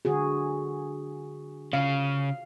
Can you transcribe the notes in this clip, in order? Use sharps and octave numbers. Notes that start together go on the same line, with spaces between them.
D3 F#4 G#4
C#3 F5